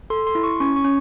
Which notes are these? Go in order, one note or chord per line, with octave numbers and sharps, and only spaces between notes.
A4 C6
C6
E4
C#6
C#4 C#6
C#6
C#4